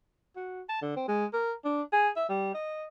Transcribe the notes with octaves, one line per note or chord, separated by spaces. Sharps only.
F#4
A5
D3
C4
G#3
A#4
D4
G#4
E5
G3
D#5